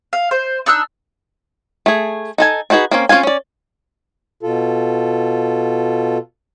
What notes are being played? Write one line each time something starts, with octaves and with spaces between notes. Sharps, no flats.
F5
C5
D4 D#4 E6 F#6
A3 G#4
D#4 A4 G#5
D4 D#4 F#4 G#4 B4
A#3 C4 C#4
C4 C#4 F4 F5 G#5
C#4 D5
B2 F4 A4